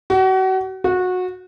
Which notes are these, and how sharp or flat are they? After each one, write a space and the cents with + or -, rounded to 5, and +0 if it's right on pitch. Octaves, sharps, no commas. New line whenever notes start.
F#4 +35
F#4 -20